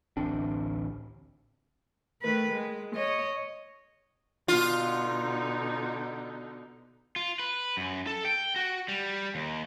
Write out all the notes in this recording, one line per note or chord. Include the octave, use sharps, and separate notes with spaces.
A1 D2 C4 D4
D#3 A3 B4
G#3
C#5 D#5
B2 D3 D#4 F4
F4
B4
F#2
A4
G5
F#4
G3
D#2